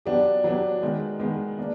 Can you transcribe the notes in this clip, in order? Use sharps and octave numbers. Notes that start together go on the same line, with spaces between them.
F#3 B3 D4 G4
F#3 B3 D4 G4
D#3 G#3 B3
D#3 G#3 B3
A#3 D4